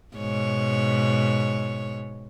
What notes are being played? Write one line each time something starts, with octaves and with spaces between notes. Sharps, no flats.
G#2 B2 C#5